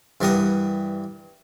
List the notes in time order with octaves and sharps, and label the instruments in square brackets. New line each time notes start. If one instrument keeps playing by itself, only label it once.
[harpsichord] G2 E3 G3 A#4 F#5 D#6